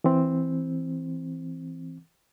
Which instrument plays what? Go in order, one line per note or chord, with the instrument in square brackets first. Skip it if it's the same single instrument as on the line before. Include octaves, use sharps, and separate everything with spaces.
[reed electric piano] E3 C4